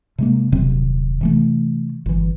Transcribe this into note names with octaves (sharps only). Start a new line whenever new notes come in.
C3 G#3 A#3
D#1 C3 F#3 C4
C3 E3 A3
G1 E3